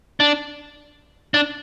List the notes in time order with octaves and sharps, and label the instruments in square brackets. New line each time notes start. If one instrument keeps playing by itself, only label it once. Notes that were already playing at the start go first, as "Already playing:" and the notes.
[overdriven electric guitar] D4
D4